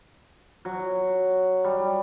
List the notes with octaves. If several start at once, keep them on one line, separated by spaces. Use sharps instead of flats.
F#3
G3